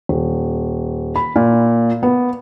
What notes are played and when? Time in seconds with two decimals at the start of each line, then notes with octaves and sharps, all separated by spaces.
0.09 D#1
1.16 B5
1.36 A#2
2.03 B3